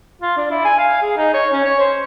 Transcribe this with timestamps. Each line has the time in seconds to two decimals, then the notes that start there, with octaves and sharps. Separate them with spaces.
0.22 F4
0.37 D4
0.51 E4
0.65 G#5
0.79 F5
1.02 G#4
1.17 D#4
1.34 C#5
1.53 C#4
1.64 C#5
1.80 C5